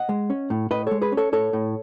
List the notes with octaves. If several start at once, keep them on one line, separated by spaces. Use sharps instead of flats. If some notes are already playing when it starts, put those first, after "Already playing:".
Already playing: D#5 F#5
G#3
C#4
A2
A2 B4 D#5
G#3 A4 C#5
G#4 B4
C#4
A4 C#5
A2 A4 C#5
A2